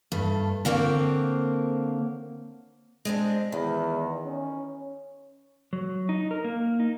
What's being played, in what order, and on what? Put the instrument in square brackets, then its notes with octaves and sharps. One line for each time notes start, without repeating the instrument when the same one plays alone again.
[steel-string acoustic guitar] G2 A3
D3 A#3 C4 C#5
G#3 C4 D4
[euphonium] E2 [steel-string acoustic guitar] D#3
[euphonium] C#4
[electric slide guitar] F#3
D#4
A#4
A#3
D#4